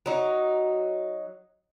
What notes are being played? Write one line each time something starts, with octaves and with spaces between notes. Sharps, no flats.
F#3 D#4